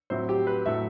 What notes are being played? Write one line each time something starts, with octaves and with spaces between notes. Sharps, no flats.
A2 F#3 C4 E4 C5
G4
B4
A2 F#3 A3 E5